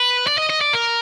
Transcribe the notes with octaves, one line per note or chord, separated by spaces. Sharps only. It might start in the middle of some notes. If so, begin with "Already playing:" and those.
Already playing: B4
D5
D#5
D#5
D5
A#4